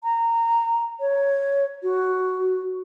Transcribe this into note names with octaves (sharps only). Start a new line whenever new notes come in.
A#5
C#5
F#4